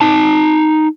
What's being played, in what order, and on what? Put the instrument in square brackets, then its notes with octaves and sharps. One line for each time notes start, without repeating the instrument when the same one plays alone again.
[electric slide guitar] D#4 A5